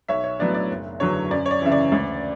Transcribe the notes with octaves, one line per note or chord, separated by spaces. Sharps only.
B1 C#5 E5
C#5
A2 F#3 B3 D4 D5
D5
F#1
E2 D3 F#3 C#5
F#2 D5
C#5
D5
C#3 E3 E5
D5
D2